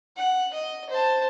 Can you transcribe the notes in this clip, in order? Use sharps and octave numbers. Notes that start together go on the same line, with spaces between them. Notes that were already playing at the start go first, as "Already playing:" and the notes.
F#5
D#5
C5 A5